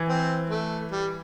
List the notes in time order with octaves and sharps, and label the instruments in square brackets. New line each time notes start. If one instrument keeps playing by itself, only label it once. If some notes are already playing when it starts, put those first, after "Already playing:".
Already playing: [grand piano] E3
[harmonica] C4
A3
G3